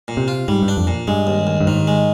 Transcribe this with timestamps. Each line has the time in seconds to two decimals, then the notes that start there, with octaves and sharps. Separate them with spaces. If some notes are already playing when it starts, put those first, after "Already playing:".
0.08 A#2
0.17 C3
0.28 F4
0.48 G#2 G3
0.62 G2
0.68 D4
0.77 F2
0.87 A#2
1.08 G2 G#3
1.27 D#2
1.47 D#2
1.60 G2
1.67 G#2 D#3
1.87 G#3